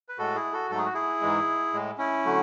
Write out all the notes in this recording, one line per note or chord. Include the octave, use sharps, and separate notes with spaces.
B4
A2 G#3 F#4 A4
E4 G#4
F#4 A4
G#2 F#3 A3 A4
G#4
F#4
E4 G#4
G#2 E3 G#3
A2 G#3
C#4 E4
D3 F#3 A3